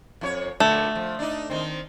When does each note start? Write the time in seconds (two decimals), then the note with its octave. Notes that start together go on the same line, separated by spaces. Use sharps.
0.21 F2 E4 C#5
0.60 A#2 D3 F#3 A3
0.95 F3
1.19 D4 D#4
1.50 D#3 C4